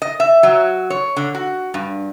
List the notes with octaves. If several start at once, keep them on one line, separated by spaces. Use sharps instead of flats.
D#5
E5
F#3
C#5
D3
F#4
G2